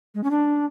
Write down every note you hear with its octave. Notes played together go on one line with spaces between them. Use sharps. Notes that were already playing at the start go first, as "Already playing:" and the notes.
G#3
C#4
D4